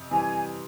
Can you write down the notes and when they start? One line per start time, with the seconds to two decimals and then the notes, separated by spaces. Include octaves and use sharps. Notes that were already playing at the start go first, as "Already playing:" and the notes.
Already playing: F2 C3
0.11 C3 E3 G3 C4 G#5